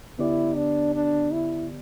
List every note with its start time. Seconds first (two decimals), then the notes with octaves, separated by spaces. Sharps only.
0.18 D2 D3 B3 E4 G4 D5
0.56 D4
0.95 D4
1.32 E4